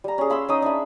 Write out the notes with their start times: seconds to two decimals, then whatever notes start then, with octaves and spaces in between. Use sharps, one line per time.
0.04 G3 A#5
0.18 C#4 G#4
0.30 F5 B5 C6 E6
0.49 C#4 D#4 D#6
0.62 D4 E5 B5